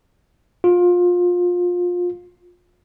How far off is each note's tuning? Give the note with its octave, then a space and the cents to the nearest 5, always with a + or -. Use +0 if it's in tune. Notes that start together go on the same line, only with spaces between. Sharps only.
F4 +25